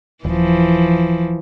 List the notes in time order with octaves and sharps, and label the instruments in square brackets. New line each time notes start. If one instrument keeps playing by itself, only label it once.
[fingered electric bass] D#1 [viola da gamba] E3 F3